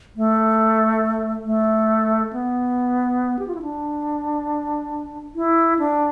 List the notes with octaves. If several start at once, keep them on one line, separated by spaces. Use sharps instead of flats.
A3
A3
B3
G4
F4
E4
D4
E4
D4